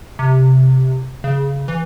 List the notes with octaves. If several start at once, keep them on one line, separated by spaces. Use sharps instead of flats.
C3
C#3
E3